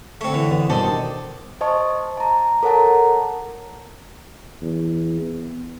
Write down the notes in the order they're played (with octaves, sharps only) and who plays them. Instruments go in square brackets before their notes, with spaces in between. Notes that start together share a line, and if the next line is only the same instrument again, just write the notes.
[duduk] D3 [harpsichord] A3 C4 [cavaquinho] C#5
[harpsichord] E3
[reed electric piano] E2 B3
[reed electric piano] G2 B2 [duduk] D#3 [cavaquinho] A4 D5 D#5 [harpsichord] C5
[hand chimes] C5 D#5 A5 C#6
A5 A#5
A4 A#4 C#5 F#5 A5 A#5
[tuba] E2
B3